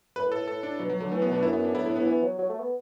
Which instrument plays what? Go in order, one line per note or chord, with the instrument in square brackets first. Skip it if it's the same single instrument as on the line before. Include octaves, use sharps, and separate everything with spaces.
[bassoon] F#2 [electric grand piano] B4
[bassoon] A2
[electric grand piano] A4
[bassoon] A2
[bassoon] A2 [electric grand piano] A4
[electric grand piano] D4
[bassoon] B2 [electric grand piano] F#3
[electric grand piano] F#3
[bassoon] D3 [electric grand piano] F#3
[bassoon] E3 [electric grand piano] A3
[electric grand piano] B3
[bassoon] B2
[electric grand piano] D4
[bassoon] F#2 [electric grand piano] E4
[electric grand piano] B3
D4
[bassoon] A2 [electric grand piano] E4
[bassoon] A2 [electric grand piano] E4
[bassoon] A2 [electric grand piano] B3
[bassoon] E3
F#3
F#3
A3
B3